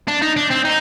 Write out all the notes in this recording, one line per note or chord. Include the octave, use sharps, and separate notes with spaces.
D4
D#4
D4
C4
D#4